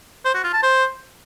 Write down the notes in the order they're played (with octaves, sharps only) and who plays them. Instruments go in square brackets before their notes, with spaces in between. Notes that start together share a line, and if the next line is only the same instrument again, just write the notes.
[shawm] C5
F#4
F4
A5
C5